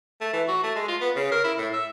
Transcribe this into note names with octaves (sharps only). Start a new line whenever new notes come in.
A3
E3
F#4
A3
G#3
F4
B3
C#3
A#4
E4
A2
E5